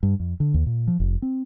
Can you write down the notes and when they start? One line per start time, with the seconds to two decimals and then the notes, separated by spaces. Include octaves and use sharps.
0.03 G2
0.20 F2
0.40 D3
0.54 D#2
0.66 A#2
0.87 F3
1.00 F1
1.22 C4